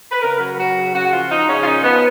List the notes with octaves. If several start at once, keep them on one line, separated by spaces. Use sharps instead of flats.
B4
C#3 A#4
F#3
F#3 F#4
C#3
C#3 F#4
F3 F4
F3 D#4
C#3 C#4
F4
A#2 D#4
F3 B3